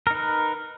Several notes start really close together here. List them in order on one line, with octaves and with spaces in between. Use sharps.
A#4 D#4 B4